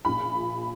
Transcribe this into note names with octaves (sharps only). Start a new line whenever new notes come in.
A#1 A#2 B5